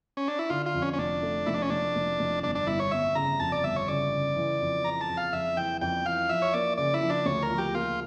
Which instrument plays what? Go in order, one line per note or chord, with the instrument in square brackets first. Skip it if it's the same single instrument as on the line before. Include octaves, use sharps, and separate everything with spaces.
[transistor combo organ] C#4
D4
E4
[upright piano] D3 [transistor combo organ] F4
[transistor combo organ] F4
[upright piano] F2
[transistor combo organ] C#4
C#4
[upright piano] F1 [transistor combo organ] D4
[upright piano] A3
[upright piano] F1 [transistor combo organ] E4
[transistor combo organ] D4
C#4
[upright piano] F1 [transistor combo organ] D4
[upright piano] F1
F1
[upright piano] G1 [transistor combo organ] D4
[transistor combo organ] D4
[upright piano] G1 [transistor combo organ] E4
[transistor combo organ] C#5
[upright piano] G1 [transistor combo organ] E5
[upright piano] C#3 [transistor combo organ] A#5
[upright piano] F2 [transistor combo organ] A5
[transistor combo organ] D5
[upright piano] G1 [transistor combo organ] E5
[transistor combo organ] C#5
[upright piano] C#3 [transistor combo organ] D5
[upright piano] C#3
E3
F2
[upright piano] E4 [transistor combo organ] A#5
[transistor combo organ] A5
[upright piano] F2
[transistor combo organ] F5
[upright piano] F2 [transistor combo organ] E5
[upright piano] E3 [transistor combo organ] G5
[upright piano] F2 [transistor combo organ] G5
[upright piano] E3 [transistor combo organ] F5
[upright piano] F3 [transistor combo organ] E5
[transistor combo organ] C#5
[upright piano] A#3 [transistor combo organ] D5
[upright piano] C#3 [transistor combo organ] D5
[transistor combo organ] E4
[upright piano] F3
[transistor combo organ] D4
[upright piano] D2 [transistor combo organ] C#5
[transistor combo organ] A#4
[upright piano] F3
[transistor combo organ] G4
[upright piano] A#3 [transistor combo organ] F4